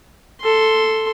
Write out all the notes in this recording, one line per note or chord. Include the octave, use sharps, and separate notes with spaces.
A4 C6